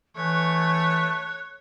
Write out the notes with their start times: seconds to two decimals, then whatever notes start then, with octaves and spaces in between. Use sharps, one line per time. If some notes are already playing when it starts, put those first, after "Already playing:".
0.17 E3 A3 C#5 F#6